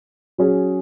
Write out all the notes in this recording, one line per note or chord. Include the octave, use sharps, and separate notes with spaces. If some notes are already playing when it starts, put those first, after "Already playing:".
F#3 C#4 G#4